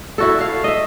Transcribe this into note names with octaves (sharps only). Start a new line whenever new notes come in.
E4 F#4 A4
A4 F5
D#5 E5